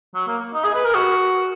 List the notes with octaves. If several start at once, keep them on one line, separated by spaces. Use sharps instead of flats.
F#3
A#3
D#4
G#4
B4
A#4
F#4